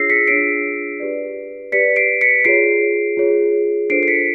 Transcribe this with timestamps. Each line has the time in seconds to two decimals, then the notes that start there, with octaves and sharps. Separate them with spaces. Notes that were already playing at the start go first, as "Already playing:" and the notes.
Already playing: D4 F4 G#4 C#5 E6 A#6 C7
0.10 B6 C#7
0.27 D4 F4 G#4 C#5 C7 D7
1.00 G4 B4 D5
1.72 G4 B4 D5 B6 C#7
1.96 C7 D7
2.21 B6 C#7
2.45 F4 G#4 C#5 C7 D7
3.17 F4 G#4 C#5
3.90 D4 F4 A4 C5 C7 D7
4.03 C7
4.08 B6 C#7